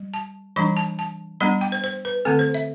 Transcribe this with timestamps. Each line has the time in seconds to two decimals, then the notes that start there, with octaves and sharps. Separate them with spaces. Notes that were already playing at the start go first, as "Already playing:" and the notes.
Already playing: G3
0.14 A5
0.56 E3 G3 D4 B5
0.77 A5
0.99 A5
1.40 G3 B3 D4 B5
1.61 G5
1.72 C5
1.84 C5
2.05 B4
2.25 D3 A3 C4 A4
2.39 C5
2.54 E5